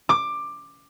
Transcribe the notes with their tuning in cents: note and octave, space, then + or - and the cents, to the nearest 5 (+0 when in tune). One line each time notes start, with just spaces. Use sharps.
D6 +15